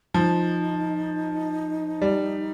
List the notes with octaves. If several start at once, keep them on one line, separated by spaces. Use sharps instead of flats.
F3 D#4
G3